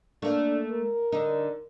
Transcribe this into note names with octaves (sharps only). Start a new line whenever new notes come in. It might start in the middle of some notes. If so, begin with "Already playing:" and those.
A3 A#3 D4
A#4
D3 D#4